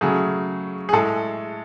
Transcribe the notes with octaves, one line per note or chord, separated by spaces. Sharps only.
C#3 F#3 A3 G#4
G#4
A2 G#3 A4